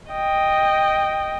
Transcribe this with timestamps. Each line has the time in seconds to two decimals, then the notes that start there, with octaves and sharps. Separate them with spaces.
0.11 D#5 G5